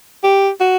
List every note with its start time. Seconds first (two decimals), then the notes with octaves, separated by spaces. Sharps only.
0.24 G4
0.60 F#4